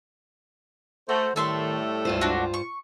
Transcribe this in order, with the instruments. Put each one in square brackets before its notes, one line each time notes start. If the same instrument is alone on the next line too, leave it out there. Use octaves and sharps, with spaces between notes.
[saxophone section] A3 [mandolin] F#4 [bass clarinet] C5
[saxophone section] A2 G3 A3 [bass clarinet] D#3 [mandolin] A4 E5 C6
[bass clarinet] C#2 [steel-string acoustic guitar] G2 F4 C5
[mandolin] D4 F#4
C#6